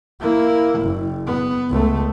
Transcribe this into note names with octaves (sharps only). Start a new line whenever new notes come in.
A#3 E4
F#1
B3
C#2 A3